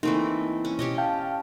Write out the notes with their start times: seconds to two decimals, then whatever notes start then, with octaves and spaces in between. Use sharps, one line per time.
0.03 E3 A3 A#3 C4 D#4
0.65 C#4
0.79 B2 G4 C#5 D#5
0.98 F5 G5 A5